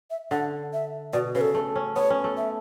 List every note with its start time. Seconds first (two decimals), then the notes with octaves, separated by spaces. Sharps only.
0.10 E5
0.31 D3 F#5
0.73 E5
1.13 B2 D5
1.35 C#3 B4
1.41 A4
1.54 A3
1.76 C#4
1.96 B3 C#5
2.10 C#4
2.24 A3
2.37 E5